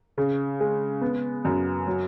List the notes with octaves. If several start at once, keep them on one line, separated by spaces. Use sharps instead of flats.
C#3
G#3
B3
F#2
F#3